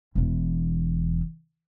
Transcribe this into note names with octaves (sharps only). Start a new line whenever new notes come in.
E1 E3